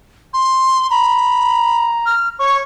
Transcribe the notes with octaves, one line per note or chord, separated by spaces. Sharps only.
C6
A#5 B5
F6
C#5 C#6